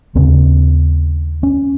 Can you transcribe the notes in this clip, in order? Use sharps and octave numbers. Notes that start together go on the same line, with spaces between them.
D#2 C#3 C4
C#4